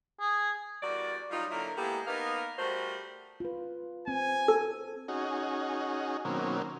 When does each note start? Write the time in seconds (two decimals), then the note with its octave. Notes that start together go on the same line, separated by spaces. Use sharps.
0.20 G#4
0.83 E2 G3 F#4 A#4 D5
1.31 F#3 G3 D#4 F4
1.51 D3 F#3 A#3 E4 A#4
1.77 G#3 A#3 B3 E4 G4 A4
2.07 A#3 B3 D#4 A#4 B4 F5
2.59 G3 A3 F#4 A#4 C5
3.40 F4 B4
4.08 C4 G#5
4.48 A4
5.08 C#4 D#4 F#4 G#4
6.25 B2 D#3 F#3 A#3 C4 C#4